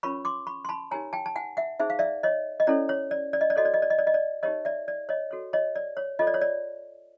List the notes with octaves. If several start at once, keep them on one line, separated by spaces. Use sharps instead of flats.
C#4 F4 A#4 C#5 B5 C#6
C6 D6
B5 C#6
C6
A5 B5
D#4 G4 A#4 C#5 G#5 A#5
G5 A5
A5
F#5 G#5
E5 F#5
D#4 G#4 C5 E5
F5
D5 E5
C#5 D#5
D#5
C#4 E4 A4 C#5 D5
C#5
D5
D5
D#5
D5
F#4 A4 C#5 D#5
D5
D#5
D5
D#5
D5
D#5
D5
D#4 G4 A#4 C#5 D#5
D5 E5
D5
C#5 D#5
F#4 A4 C#5
C#5 D#5
D5
C#5
F4 A4 C#5 D#5
D5
C#5
D5